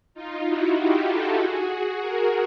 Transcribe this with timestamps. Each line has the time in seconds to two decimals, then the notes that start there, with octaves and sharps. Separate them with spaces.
0.14 D#4 F4
0.46 E4 F#4
0.77 F4 G4
1.07 G4 A4
1.38 F#4 G#4
2.00 G#4 A#4